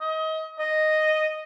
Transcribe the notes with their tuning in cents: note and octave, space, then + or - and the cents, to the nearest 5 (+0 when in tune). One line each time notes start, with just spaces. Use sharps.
D#5 +30
D#5 -5